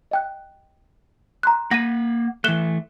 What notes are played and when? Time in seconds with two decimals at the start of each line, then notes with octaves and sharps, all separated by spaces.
0.11 D#5 G5 F#6
1.43 A#5 C6 F#6
1.71 A#3 F#5 A#6 D#7
2.44 E3 A3 F#6 E7 G7